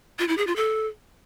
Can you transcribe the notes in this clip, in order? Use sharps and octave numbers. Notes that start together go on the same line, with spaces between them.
F4
E4
G#4
F4
A4